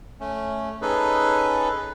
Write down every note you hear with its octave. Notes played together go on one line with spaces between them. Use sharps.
A3 C#4
C#4 D#4 G#4 A4 B4